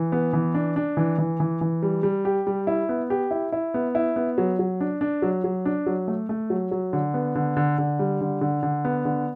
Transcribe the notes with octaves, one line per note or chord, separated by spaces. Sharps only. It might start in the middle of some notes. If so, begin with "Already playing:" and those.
Already playing: E3
B3
E3
D4
D4
E3
E3
E3
E3
G3
G3
G4
G3
E4
B3
G4
E4
E4
B3
E4
B3
F#3
F#3
D4
D4
F#3
F#3
D4
F#3
A3
A3
F#3
F#3
D3
B3
D3
D3
D3
G3
D3
D3
D3
B3
D3